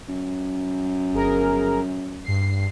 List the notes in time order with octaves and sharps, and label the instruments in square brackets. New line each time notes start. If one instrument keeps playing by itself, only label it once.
[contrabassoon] F#2
[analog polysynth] G1 G#4 A#4
G2 C7